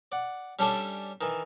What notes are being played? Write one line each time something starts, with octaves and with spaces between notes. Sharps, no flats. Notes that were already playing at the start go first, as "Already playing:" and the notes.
D5 F#5
G3 C#4 D4 A4 D5 E5
D#3 E3